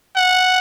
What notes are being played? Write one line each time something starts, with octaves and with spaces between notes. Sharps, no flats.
F#5